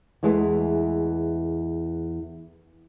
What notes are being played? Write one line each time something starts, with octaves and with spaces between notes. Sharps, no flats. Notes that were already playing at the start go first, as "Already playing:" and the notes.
E2 E3 G#3 A3